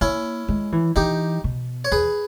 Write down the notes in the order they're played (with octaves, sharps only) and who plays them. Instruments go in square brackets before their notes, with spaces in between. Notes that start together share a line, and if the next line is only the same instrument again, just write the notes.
[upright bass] A#3 [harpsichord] C#4 E4
[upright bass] G#3
E3
[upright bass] E3 [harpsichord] D#4 G4
[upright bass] B2
[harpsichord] C#5
[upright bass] E2 [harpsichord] G#4 B4